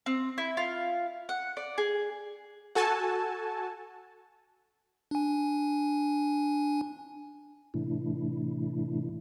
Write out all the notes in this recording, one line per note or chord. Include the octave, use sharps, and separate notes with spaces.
C4
E4
F4
F#5
D5
G#4
F#4 A4 G#5 A5
D4 G#5
A2 C3 E3 A3 D4 E4